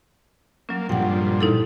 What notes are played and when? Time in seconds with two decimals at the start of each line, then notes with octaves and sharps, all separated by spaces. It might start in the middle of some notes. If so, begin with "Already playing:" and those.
0.69 F#3 A#3 C#4
0.89 G2 A#2 F3 F#5 G5
1.41 D#4 E4 A4